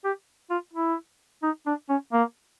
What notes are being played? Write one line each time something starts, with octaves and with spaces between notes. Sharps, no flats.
G4
F4
E4
D#4
D4
C#4
A#3